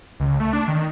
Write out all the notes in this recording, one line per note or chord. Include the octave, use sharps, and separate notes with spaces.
C#2
A3
D4
D#3